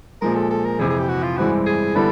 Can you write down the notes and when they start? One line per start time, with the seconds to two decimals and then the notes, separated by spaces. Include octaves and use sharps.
0.21 A#2 F3 G#3 A#4
0.36 A4
0.50 A4
0.65 A#4
0.79 F2 C3 E3 G#4
0.90 G#4
0.99 G4
1.09 F#4
1.23 F4
1.37 G2 E3 G#3 C4 E4 F#4
1.66 G#4
1.95 D3 G3 B3 E4 A4